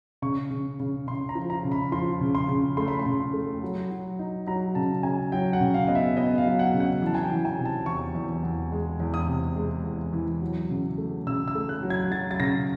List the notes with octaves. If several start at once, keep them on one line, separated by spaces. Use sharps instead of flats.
C#3 C#6
C#3
C#3
C#3 C6
A#5
F3
A#5
C#3
B5
F3 C6
C#3
C6
C#3
A3 C6
B5
C6
C#3
A3
F#3
F#3
D#4
F#3 A#5
C#3 A5
C#3 G#5
F#3 G5
F#5
C#3
F5
B3 D#5
E5
B3 D#5
F5
F#3
F#5
C#3
F#5
E3 A5
G#5
G5
E3
G#5
C3
A5
E2 C#6
E2
E2
G#3
E2
D#6
C3
G#3
E2
E3
F#3
C#3
A3
C#3 E6
E6
A3
F#6
F#3
G#6
F#3 A6
A6
C#3 A#6